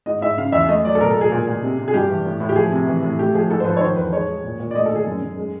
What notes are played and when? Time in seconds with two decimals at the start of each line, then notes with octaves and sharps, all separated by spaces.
0.06 G#2 D#5
0.21 G#2 E5
0.37 C#3 F5
0.52 E2 E5
0.69 A3 D#5
0.84 F#3 D5
0.95 A4
1.01 B2 A#4
1.11 A4
1.15 B2
1.21 G#4
1.32 A#2
1.47 A#2
1.63 C3
1.78 C3
1.88 G#4
1.94 G2 G4
2.09 E3
2.25 A2
2.40 A2
2.49 G4
2.56 F3 G#4
2.72 C3
2.87 E3
3.02 A2
3.18 A3 G4
3.34 F3 G#4
3.49 G#2 A4
3.60 C5
3.65 F3 B4
3.77 C#5
3.81 D#3 C5
3.96 E2 B4
4.13 G#3 C#5
4.28 G#3
4.43 A#2
4.59 A#2
4.71 D5
4.75 A3 D#5
4.86 A4
4.91 D#3 G#4
5.07 F#2
5.22 F#2
5.38 G#3